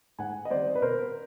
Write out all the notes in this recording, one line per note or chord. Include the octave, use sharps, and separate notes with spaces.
G#2 F#5 G#5
D#5
D#3 G3 C4 C5 D5
B4
B2 A#4 C5